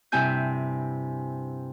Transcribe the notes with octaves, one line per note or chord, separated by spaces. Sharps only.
G2 C3 C4 E4 G#5 G6